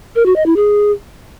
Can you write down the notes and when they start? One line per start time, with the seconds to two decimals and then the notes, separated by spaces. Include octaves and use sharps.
0.16 A#4
0.26 F#4
0.36 D#5
0.46 E4
0.56 G#4